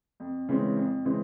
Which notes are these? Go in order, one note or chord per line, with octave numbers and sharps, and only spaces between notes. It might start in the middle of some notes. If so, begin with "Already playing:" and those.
F2
C#3 E3 G#3 C4
F2
C#3 E3 G#3 C4